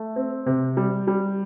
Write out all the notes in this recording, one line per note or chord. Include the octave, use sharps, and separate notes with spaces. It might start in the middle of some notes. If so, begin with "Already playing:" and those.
Already playing: A3
C4
C3
G3
G3